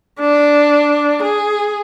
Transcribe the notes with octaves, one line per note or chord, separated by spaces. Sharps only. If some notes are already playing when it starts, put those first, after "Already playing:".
D4
G#4